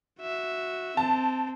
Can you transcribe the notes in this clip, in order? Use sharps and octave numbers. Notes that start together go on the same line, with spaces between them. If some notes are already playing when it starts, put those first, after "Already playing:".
F#4 E5
C4 A5